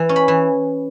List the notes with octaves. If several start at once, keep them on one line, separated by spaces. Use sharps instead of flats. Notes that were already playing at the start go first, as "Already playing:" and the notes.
Already playing: E3
C#4
B5
E3